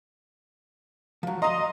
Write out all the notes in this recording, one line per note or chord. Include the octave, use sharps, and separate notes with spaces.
F3 F#3
D#5 F5 A#5 C6 D#6